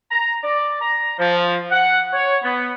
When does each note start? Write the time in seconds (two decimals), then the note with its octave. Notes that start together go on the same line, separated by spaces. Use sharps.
0.11 A#5
0.43 D5
0.81 A#5
1.19 F3
1.71 F#5
2.13 C#5
2.43 B3